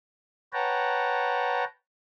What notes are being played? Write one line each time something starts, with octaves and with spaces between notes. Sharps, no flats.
B4 C#5 F#5 G5 A5 A#5